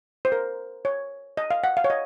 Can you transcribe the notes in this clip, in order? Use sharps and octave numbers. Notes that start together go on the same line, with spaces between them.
C5
A#4
C#5
D#5
F5
F#5
F5
C#5
D#5